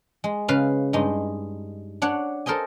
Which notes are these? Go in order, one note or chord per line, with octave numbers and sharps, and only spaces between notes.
G#3
C#3 B4 F5
G2 G#3 D#4
D4 C#5 F#5
A4 A#4 C5 D#5 G#5